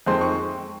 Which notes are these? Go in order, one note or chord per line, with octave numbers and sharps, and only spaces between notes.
F2 D#3 G#3 C4 C6
C#6